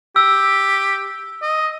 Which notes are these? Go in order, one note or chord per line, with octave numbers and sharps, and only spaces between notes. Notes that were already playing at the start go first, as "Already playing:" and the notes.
G4 E6
D#5